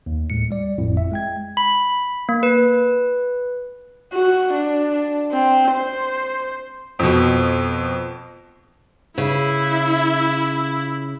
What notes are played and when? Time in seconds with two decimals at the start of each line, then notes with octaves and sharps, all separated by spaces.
0.06 D#2
0.30 D2 A2 G#3 C#7
0.51 G3 D5
0.78 G#1 F2 A2 E4
0.97 E5
1.12 G#3 G5 G#6
1.57 B5
2.29 A#3
2.43 B4
4.13 F#4
4.54 D4
5.32 C4
5.71 C5
6.99 F2 B2
9.18 C#3 E4